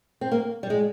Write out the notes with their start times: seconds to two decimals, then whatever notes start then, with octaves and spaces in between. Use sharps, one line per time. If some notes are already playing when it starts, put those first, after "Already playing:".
0.21 C4
0.31 A#3
0.63 G3
0.70 G#3